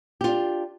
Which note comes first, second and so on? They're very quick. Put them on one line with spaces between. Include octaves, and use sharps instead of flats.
G4 F4 D4